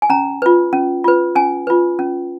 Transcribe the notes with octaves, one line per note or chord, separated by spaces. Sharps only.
G#5
C#4 A#5
F4 B4
C#4
F4 B4
C#4 G#5
F4 B4
C#4